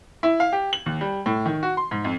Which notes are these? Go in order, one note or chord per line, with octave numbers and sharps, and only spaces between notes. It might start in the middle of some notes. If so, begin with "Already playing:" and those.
E4
F5
G4
F#7
D#2
G3
A2
D#3
F#4
C6
G#2
F2